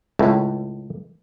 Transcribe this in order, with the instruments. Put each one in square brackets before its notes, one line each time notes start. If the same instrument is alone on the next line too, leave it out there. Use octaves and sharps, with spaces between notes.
[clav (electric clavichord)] C#2 A2